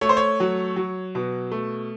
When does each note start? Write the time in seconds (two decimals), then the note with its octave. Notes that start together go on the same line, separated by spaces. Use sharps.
0.01 A3 C#5
0.09 C5
0.17 C#5
0.40 F#3
0.76 F#3
1.15 B2
1.52 A3